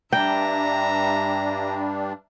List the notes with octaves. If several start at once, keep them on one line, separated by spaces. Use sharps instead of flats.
G2 G3 D4 E5 G5 A#5